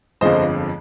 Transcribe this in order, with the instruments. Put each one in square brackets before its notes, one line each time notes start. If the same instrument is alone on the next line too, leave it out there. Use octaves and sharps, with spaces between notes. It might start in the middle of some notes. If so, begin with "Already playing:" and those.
[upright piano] G1 F2 D3 F3 G#3 C5 D#5